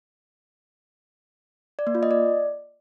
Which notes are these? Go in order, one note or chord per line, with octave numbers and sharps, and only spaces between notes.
D5
A#3
F4
D#5
D5